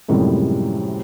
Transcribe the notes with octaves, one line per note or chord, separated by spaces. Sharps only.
F#2 A2 C3 F3 G3 G#3